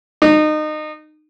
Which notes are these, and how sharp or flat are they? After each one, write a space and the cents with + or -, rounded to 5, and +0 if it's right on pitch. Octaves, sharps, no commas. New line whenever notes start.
D#4 -25